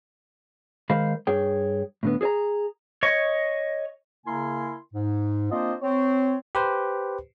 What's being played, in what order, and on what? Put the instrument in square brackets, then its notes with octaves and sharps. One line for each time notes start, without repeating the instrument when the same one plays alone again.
[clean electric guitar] D#3 G#3 A#4 C5 F5 B5
G2 G#4 C#5 G5
A2 D3 B3
G#4 A4 C#5 G#5 A#5
[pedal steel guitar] C#5 D#5 C#6
[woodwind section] C#3 A#3 E4 A#4 G#5 C6
G#2
A#3 C4 D4 F4 C5 D#5
C4 C#5
[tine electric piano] G4 B4 C5